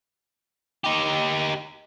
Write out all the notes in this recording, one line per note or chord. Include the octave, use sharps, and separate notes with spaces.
D#4 G4